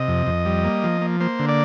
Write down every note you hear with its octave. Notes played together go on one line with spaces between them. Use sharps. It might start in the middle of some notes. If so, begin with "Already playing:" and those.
Already playing: C3 D#5
F2
F2
G3
A#3
F3
A#3
A#3 C5
D3
D5